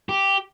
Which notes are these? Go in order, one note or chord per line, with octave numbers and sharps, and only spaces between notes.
G4